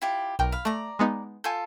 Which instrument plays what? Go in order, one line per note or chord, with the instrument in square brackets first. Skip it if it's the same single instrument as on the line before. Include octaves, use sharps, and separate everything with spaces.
[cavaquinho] E4 F4 G4
[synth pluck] B1 G5 [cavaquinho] A#4
[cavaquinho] F5 B5
[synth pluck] A3 [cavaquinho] D5 A#5
[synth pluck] G#3 B3 D#4
[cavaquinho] F4 A4 [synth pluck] G#5 G6